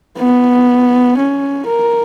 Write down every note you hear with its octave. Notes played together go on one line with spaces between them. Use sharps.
B3
C#4
A#4